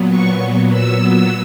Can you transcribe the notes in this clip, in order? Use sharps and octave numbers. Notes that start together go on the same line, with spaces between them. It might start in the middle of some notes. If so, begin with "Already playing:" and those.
Already playing: A#2 F#3 B3
C#6
E6